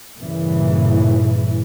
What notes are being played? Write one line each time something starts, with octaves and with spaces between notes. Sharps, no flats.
G2 A#2 C#3 E3